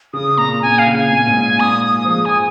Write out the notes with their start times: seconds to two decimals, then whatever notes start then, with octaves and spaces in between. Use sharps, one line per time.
0.13 C#3 D#6
0.38 A#2 A#5
0.62 A#2 G#5
0.79 F5
0.87 C#3
0.95 G#5
1.11 A#2
1.27 G#2
1.36 A#2
1.60 A#2 D#6
1.85 D#6
2.05 F3
2.09 G#3 D#6
2.25 G#5